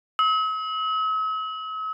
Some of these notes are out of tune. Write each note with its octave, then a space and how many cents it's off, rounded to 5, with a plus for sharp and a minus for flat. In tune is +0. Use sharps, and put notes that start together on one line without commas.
E6 -45